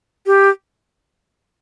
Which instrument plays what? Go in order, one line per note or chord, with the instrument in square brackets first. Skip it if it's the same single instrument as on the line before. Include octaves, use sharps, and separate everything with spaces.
[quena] G4